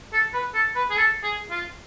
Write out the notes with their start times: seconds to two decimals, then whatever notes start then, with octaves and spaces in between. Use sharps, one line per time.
0.13 A4
0.34 B4
0.54 A4
0.75 B4
0.90 G#4
0.96 A4
1.23 G#4
1.51 F4